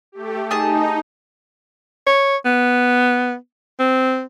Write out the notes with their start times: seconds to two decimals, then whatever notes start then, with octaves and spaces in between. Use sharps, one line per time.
0.12 A3 G4
0.51 D#4 G#4 A5
2.07 C#5
2.45 B3
3.80 C4